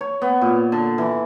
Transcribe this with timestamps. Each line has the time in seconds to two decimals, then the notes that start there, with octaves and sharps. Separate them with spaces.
0.01 C#5
0.21 B3
0.41 A#2
0.72 D3
0.98 E3